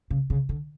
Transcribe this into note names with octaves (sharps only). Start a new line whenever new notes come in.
C#3
C#3
D3